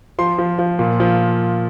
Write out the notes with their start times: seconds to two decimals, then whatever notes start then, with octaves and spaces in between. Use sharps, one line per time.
0.19 F3 C6
0.39 F3
0.59 F3
0.79 A#2
1.00 F3